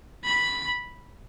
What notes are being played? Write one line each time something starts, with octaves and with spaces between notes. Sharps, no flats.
B5